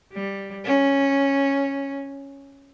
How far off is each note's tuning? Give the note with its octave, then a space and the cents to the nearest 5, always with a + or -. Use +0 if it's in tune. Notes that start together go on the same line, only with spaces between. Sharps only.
G3 +5
C#4 -5